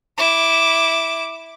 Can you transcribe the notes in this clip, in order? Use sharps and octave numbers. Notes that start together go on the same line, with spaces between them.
E4 D6